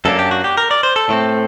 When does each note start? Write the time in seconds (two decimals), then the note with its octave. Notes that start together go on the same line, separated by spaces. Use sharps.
0.05 F#2 F#3 A#3 D4 A4
0.19 G4
0.31 F#4
0.44 G4
0.57 A#4
0.71 D5
0.83 C5
0.96 A4
1.09 A2 A3 C4